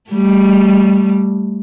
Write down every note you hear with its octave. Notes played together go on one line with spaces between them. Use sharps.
G3 A3